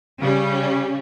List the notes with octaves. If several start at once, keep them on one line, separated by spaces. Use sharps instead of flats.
C#3 G3 C#4